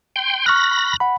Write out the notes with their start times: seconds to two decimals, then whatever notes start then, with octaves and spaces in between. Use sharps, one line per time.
0.16 G5 C6
0.46 B5 C#6 F6 F#6 A#6
1.00 F#5 B5